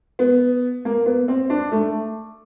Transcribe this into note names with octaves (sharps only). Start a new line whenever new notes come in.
B3
A#3
B3
C4
D4
A3